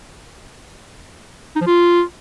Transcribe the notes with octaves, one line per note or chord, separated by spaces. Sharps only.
D#4
F3
F4